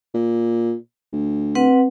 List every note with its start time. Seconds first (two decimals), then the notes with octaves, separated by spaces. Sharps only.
0.14 A#2
1.12 D2
1.55 C4 B4 F#5